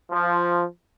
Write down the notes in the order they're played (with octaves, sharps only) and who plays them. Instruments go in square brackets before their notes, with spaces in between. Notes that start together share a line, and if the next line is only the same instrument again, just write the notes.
[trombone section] F3